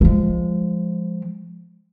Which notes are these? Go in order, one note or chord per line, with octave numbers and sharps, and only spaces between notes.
F3 G#3